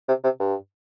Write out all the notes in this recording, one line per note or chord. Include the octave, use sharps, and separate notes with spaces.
C3
C3
G2